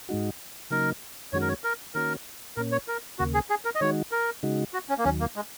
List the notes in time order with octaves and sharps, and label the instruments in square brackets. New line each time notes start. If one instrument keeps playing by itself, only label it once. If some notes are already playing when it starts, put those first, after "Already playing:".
[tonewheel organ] G#2 G#3 D#4 F#4
[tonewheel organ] C#3 F#3 A#3 D#4 [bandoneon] A#4
[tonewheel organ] F#2 D#3 G#3 C#4 F#4 [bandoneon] C#5
[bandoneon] A#4
C#5
A#4
[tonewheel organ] D#3 A#3 C#4 F#4 [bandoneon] A#4
[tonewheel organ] A#2 A#3 C#4 [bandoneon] A#4
[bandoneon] C#5
A#4
[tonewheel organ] D#2 C#3 A#3 [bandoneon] F#4
[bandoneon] G#4
G#4
A#4
D#5
[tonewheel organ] D#3 G#3 D#4 F#4 [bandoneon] C#5
[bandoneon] A#4
[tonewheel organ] C#3 G#3 D#4 F#4
[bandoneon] F#4
C#4
A#3
[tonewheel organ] D#2 D#3 F#3 [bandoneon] C#4
[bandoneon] A#3
G#3